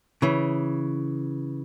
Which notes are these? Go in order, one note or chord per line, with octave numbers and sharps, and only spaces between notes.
C#3 E3